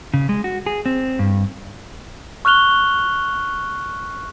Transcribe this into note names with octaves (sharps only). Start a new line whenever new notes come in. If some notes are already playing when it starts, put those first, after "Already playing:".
C#3
G#3
F#4
G#4
C4
G2
C#6 F6 F#6 F7 G7